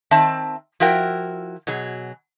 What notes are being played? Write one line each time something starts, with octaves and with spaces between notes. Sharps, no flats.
D#3 C4 E5 A5
F3 E4 F#4 A#4 G5
B2 F#3 G#4